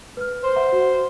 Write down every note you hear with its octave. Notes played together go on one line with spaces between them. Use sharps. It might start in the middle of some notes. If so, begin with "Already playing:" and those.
B4 F6
C5
E5 F#5 A#5
F#4